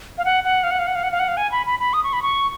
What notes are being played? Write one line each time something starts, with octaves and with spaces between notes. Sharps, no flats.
F5
F#5
F#5
F5
F#5
F5
F#5
F5
F#5
F5
F#5
F5
G#5
B5
B5
B5
D#6
C#6
B5
C#6